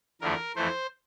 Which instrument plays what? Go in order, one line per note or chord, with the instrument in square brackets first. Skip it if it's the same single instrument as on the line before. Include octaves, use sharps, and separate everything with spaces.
[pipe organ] E2 D3 F3 A3 A#4
F2 E3 A3 C5